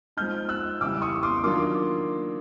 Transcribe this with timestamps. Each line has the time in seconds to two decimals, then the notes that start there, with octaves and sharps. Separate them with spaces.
0.17 F3 G#3 C4 D#4 F6 G6
0.49 E6 F#6
0.81 C#3 E3 G3 D6 E6
1.02 C#6 D#6
1.23 C6 D6
1.43 D#3 F#3 A#3 D4 F4 C6 D6